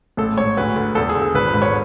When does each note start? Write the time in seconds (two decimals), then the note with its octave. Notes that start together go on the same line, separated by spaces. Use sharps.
0.17 A1 A4
0.37 G#2 C#5
0.57 D2 B4
0.76 D3
0.95 E2 A4
1.09 G#4
1.15 D3
1.22 A4
1.34 G#1 B4
1.54 G#2
1.62 C#5